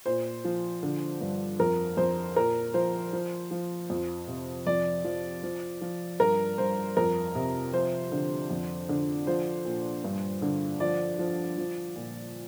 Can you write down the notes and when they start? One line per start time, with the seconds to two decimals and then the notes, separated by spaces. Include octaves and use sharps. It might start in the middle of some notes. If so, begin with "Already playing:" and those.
0.06 A#2 C5
0.45 F3
0.83 D3
1.21 G2
1.60 F2 A#4
1.97 F2 C5
2.36 A#2 A#4
2.74 F3 C5
3.13 F3
3.51 F3
3.90 F2
4.28 C3
4.67 F2 D5
5.04 F3
5.43 F3
5.81 F3
6.19 G2 A#4
6.58 G2 C5
6.97 F2 A#4
7.35 C3
7.73 F3 C5
8.12 D3
8.51 F2
8.89 D3
9.27 F3 C5
9.65 A#2
10.04 G2
10.42 D3
10.80 F3 D5
11.19 F3
11.58 F3
11.96 A#2